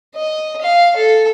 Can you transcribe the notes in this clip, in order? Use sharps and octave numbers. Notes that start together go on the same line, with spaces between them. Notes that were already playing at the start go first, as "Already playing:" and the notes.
D#5
F5
A4